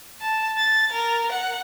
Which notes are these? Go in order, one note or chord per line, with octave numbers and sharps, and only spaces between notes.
A5
A6
A#4
F#5